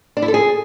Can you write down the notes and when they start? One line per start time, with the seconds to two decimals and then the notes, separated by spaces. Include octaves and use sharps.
0.17 D4
0.22 E4
0.28 A4
0.34 G#4